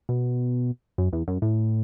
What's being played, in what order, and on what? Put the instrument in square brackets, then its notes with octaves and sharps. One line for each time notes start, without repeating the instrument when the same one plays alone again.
[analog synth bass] B2
F#2
E2
F#2
A2